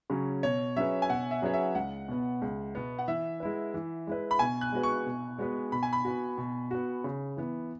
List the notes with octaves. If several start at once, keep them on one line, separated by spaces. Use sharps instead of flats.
C#3 F#3 C#4
B2 C#5
F#3 C#4 G#4 B4 E5
G#5
B2 F#5
E5
F#3 C#4 G#4 B4 C#5
E5
C#2 F#5
B2 B3
C#2
B2 B3
F#5
E3 E5
G#3 E4 B4
E3
G#3 E4 B4
B5
B2 G#5
F#6
G#3 B3 F#4 B4
C#6
B2
G#3 B3 F#4 B4
B2 B5
G#5
B5
B3 F#4
B2
B3 F#4
C#3
E3 B3